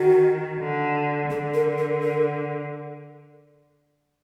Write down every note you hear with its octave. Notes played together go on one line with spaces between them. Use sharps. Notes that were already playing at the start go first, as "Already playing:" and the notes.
Already playing: D#3 F#4
D3
D3 A4
A#4
A#4
A#4